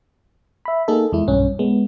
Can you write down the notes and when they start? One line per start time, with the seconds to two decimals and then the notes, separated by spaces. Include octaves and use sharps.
0.65 E5 B5
0.88 A#3 D#4 G#4 A4
1.12 E2 G#3 E4
1.28 B1 G2 C#4
1.59 G#3 B3